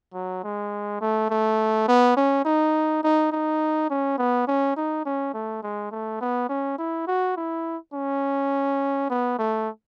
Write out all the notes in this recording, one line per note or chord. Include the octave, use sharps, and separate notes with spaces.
F#3
G#3
A3
A3
B3
C#4
D#4
D#4
D#4
C#4
B3
C#4
D#4
C#4
A3
G#3
A3
B3
C#4
E4
F#4
E4
C#4
B3
A3